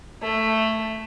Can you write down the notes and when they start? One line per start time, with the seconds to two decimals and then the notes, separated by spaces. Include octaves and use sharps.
0.22 A3